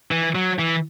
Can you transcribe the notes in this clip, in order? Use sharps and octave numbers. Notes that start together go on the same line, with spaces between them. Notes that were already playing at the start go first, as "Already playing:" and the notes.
E3
F#3
E3